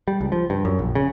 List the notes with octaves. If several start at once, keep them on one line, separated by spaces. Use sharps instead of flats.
G3
C#2
F3
G2
F#2
A#1
C#3